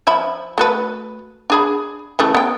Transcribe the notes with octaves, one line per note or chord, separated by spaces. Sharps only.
F3 E5 B5
A3 F#4 B4
D4 G#4 B5
C#3 E3 A3
B3 G5